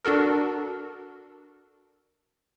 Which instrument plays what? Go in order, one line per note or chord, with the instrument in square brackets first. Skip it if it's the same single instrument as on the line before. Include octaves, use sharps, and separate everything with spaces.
[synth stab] D4 F#4 A4 A#4